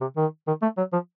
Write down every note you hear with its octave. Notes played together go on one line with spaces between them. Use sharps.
C3
D#3
D#3
A3
F#3
F3